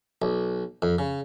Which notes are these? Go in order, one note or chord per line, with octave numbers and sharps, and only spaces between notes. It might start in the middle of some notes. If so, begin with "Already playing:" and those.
B1
F2
C#3